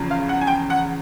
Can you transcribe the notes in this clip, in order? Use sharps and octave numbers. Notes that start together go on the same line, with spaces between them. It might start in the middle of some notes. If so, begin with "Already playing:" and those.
Already playing: E2 C#3 F3
F5
F#5
G#5
G5
F#5